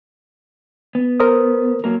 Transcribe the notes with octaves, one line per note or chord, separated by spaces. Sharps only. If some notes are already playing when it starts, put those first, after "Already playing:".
B3
A#4 C5 D#6
F#3 A#3 A#4